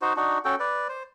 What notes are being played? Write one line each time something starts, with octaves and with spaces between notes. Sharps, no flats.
D#4 F#4 C5
D4 D#4 F#4
C#4 F#4 A4 G5
B4 D5
C5